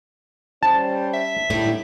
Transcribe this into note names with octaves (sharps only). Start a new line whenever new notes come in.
G3 C#4 C5 A5
E5
A2 D3 G3 D#4